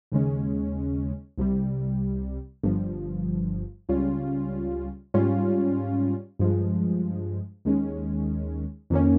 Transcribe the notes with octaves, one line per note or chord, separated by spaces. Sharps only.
D#2 C#3 G#3 C#4
C2 C3 G3
G1 G2 F3
C#2 C#3 G3 C#4 F4
G#2 G3 C#4 F4
G2 F3 G#3
D#2 D#3 G#3 C#4
F2 D#3 A#3 C#4